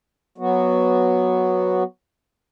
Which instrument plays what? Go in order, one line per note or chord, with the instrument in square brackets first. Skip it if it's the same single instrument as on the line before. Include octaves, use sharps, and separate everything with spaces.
[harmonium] F#3 B3 F#4